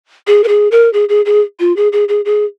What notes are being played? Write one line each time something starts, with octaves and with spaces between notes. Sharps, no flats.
G#4
A#4
G#4
A#4
G#4
G#4
G#4
F4
G#4
G#4
G#4
G#4